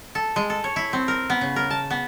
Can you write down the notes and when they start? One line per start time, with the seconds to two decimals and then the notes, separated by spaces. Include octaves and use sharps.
0.15 A4
0.36 G#3
0.50 A4
0.64 C#5
0.76 E4
0.93 C4
1.08 A#4
1.30 B3
1.41 C#3
1.56 A#4
1.71 A5
1.91 B3